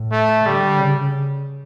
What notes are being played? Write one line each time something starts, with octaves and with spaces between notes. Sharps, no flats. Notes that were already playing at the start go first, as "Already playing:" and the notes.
Already playing: A2
A3
D3 G3
C#3